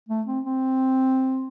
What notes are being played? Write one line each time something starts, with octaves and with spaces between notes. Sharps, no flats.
A3
C4
C4